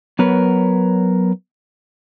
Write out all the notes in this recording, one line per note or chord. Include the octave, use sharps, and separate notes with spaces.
F#3 B3 A#4 B4 C#5